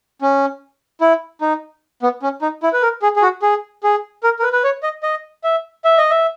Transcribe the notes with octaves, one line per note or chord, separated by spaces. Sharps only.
C#4
E4
D#4
B3
C#4
D#4
E4
B4
A#4
G#4
G#4
F#4
G#4
G#4
A#4
A#4
B4
B4
C#5
D#5
D#5
E5
E5
D#5
E5